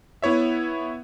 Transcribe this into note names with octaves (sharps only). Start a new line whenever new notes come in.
B3 E4 C#5 E5